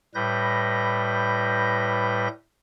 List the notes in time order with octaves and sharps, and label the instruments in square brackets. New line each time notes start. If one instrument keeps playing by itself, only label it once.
[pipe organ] A2 G3 B4 G6 A#6